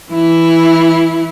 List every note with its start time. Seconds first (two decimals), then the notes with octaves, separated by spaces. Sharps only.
0.12 E3 E4